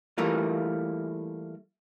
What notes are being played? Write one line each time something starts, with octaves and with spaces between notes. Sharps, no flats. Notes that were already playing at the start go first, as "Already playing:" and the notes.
E3 G3 A3 A#3 F4